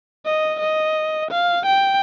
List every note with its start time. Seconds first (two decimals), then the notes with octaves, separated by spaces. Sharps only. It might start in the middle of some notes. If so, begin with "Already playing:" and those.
0.26 D#5
0.60 D#5
1.31 F5
1.66 G5